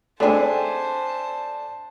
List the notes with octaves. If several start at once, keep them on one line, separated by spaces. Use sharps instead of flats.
G#3 A3 C4 D4 C5 G#5 A5